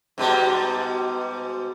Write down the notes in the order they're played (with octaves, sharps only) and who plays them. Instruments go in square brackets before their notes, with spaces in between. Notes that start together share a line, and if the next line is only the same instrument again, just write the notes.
[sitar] G#2 B2 G3